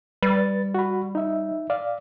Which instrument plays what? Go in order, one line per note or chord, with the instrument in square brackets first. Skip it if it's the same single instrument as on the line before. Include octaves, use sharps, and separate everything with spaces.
[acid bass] G3 [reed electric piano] B4 A6
[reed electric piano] F#4 B5
D#4 E5
D5 F5